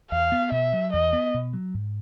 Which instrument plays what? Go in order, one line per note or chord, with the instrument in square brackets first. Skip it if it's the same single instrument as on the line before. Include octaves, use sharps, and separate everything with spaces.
[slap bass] E2 [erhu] F5
[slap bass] B3
[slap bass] B2 [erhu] E5
[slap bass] F#3
[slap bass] E2 [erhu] D#5
[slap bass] B3
B2
F#3
G#2